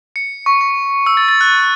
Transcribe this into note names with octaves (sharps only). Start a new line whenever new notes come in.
C#7
C#6
C#6
E6
A6
A6
F#6